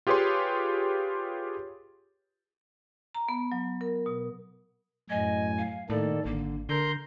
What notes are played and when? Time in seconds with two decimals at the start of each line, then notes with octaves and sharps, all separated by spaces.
0.07 F4 G4 G#4 B4 C#5 C6
3.15 A#5
3.29 B3
3.52 F#3
3.81 A#4
4.06 B2
5.10 F#2 A2 D#5 G#5
5.58 F5
5.90 A2 D#3 A#3 A4 D5
6.25 G#1 D3 A#3
6.69 D3 A#4 A#5 C6 G6